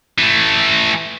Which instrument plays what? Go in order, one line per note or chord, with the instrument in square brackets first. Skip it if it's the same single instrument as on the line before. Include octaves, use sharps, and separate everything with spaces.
[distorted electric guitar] E3 A3